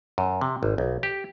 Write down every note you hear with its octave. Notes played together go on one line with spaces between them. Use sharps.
F#2
C3
G#1
B1
G4